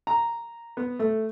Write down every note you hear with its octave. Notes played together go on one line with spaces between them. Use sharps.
A#5
B3
A3